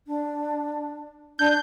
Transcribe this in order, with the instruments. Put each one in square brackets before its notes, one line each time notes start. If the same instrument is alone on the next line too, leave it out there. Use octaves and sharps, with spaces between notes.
[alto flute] D4
[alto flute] D4 [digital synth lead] G6